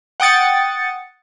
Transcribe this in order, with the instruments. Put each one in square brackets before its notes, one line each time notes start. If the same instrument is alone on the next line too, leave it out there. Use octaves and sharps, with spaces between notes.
[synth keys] F#5 G5 D#6 A6 C#7